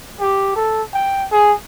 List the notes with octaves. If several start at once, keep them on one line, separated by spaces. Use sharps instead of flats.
G4
A4
G5
G#4